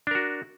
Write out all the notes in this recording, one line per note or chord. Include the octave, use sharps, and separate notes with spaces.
D4 F#4 A#4